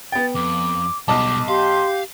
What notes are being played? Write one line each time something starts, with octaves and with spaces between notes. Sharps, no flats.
B3 G5 A6
F2 D6
B1 B2 G3 D#5 A5 D6
G4 F5 C6